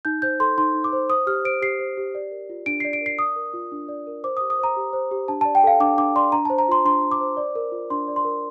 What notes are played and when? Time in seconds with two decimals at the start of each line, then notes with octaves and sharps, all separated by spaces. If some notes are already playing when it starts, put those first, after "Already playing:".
0.05 D#4 G6
0.22 C5 G6
0.40 A4 C6
0.58 D#4 C6
0.74 D#4
0.84 D6
0.93 C5
1.10 C5 D#6
1.27 G4 F6
1.45 C5 D7
1.62 G4 C7
1.79 C5
1.97 G4
2.15 D5
2.31 A#4
2.50 F4
2.66 D4 D7
2.80 D5 C7
2.93 D7
3.01 A#4 C7
3.19 D5 D#6
3.36 A#4
3.54 F4
3.72 D4
3.89 D5
4.07 A#4
4.24 C5 D6
4.37 G4 D#6
4.50 D#6
4.59 C5 A#5
4.77 G4
4.93 C5
5.11 G4
5.28 D4 A5
5.41 D5 A5
5.55 G5
5.64 A4 F5
5.80 D4 D6
5.97 D4 D6
6.16 D5 C6
6.32 D4 A#5
6.45 C5 A5
6.58 A#5
6.68 F4 C6
6.85 D4 C6
7.02 D4
7.12 D6
7.21 C5
7.37 D5
7.55 A#4
7.72 F4
7.90 D4 C6
8.08 D5
8.16 C6
8.25 A#4